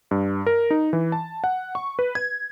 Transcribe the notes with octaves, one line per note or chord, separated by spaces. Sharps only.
G2
A#4
D#4
E3
A5
F#5
C#6
B4
G#6